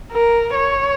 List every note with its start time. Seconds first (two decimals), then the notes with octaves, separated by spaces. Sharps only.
0.12 A#4
0.56 C#5